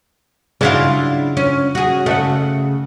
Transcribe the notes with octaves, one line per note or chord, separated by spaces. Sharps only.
C#3 F#3 D4 E4 F4
C#4
F#4 G#4
C#3 A3 E5 F#5